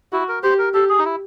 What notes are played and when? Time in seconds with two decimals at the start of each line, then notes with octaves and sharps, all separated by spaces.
0.12 E4 F#4
0.28 A#4
0.43 G4 C5
0.58 A#4
0.74 G4 A4
0.89 G#4
0.99 D#4
1.05 E4